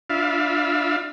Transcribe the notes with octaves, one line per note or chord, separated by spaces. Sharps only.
D4 F4 E5 F5 B5